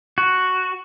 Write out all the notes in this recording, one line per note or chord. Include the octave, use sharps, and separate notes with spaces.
F#4